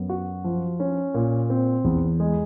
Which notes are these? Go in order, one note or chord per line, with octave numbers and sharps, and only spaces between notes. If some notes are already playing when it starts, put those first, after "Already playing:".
Already playing: F#2 B3
F#4
F3
C#4
A#2
C4
E2
G#3